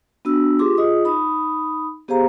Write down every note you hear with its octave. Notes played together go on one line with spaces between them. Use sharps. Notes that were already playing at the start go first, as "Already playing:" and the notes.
B3 D4 F#4 E6
F4 G4 G#4 C6 D6
F4 G#4 D#5 D#6
D#4 B5 D#6
B3 G4 G#4 C5 F5 A#5